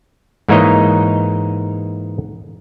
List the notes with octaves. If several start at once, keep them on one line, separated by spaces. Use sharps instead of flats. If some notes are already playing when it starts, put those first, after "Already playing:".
G#2 E3 A#3 D#4 C#5 D#5